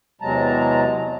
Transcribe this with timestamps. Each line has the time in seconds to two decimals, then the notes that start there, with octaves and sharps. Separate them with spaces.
0.21 E2 C3 F#3 G#3 A5 A#5